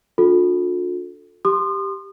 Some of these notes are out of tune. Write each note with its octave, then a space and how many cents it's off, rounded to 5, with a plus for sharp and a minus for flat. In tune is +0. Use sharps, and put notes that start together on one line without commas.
D4 -5 F4 +45 A4 +5
G4 +0 C6 +0 D#6 -40